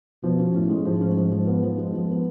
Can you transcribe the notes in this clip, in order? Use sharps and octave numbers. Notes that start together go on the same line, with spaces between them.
B2 F3
C#4
A2 C#4
G#3
G#2 F3
C#4
F3
F3
B3
F3
G#3
F3
B3